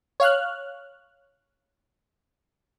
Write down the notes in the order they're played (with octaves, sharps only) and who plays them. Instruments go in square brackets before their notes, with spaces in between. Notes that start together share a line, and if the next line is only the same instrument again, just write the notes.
[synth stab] C#5 F5 F6 F#6